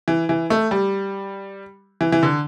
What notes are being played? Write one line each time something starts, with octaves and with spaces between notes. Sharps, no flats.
E3
E3
A3
G3
E3
E3
D3